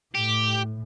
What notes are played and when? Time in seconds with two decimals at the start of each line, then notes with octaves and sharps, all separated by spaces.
0.15 A2 G4